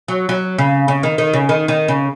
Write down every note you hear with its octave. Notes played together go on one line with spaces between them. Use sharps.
F#3
F#3
C#3
C#3
D#3
D#3
C#3
D#3
D#3
C#3